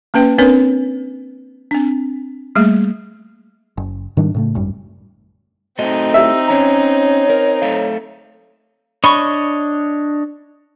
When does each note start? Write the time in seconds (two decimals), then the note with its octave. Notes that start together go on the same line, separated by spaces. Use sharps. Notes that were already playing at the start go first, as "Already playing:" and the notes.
0.14 A#3 C#4 B4 G5
0.38 C4 D4 A#4 B4 C#5
1.71 C4 D4
2.55 G3 A3 A#3 G#4
3.77 F#1
4.17 G#2 D#3 G3 D4
4.35 A2 C#3 A3
4.55 G#1 F#2 G3
5.79 A3 C4 D#4 F#4 D#5
6.14 G4 E5
6.48 C#4 C#5 A#5
7.30 A#4
7.62 A3 A4 F5
9.04 D4 C#5 D#5 B5 C#6